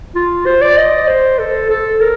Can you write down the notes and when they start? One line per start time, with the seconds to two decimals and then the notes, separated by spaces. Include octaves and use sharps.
0.15 F4
0.46 C5
0.62 D5
0.77 D#5
1.08 C5
1.39 A4
1.70 A4
2.01 A#4